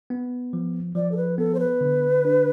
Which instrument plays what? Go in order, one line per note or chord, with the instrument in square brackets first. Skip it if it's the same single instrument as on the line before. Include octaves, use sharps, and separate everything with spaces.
[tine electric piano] B3
F3
[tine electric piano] F3 [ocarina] D5
[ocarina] A4
B4
[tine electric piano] B3 [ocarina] A4
[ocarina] C5
B4
[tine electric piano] D3
D4